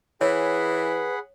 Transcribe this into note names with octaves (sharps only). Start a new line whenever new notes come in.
E3 G#4 B4 C#5 F#5 B5